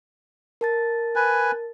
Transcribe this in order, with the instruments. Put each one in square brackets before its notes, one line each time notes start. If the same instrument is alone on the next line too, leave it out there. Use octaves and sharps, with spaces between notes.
[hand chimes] A#4 A5 A6
[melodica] B4 G#5